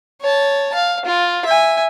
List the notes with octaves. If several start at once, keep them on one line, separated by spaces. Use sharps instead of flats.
C#5 A5
F5
F4
E5 G#5